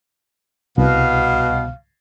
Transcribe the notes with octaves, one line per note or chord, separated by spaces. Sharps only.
C2 B2 F5